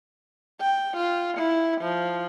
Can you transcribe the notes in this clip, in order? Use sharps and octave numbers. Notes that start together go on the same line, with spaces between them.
G5
F4
E4
F3